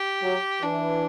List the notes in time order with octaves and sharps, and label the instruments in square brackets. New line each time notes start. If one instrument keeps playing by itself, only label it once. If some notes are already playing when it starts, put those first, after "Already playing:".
Already playing: [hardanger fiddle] G4
[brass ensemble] F#3
[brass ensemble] E3 [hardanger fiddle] D4